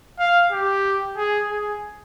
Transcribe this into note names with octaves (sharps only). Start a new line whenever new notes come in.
F5
G4
G#4
G#4